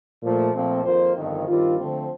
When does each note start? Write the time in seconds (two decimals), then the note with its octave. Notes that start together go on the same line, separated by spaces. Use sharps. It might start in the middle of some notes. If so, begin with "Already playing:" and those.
0.22 A#2 F3 A3
0.52 A#1 A#2 F3 A3 C4
0.84 F2 D#3 A#3 F4 C5
1.16 G1 F2 C3 D#3
1.47 G2 D#3 G3 C4 F4
1.78 D3 F3 A3 C4